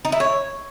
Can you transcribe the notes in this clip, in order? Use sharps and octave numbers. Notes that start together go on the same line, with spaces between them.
D#4
E4
C#5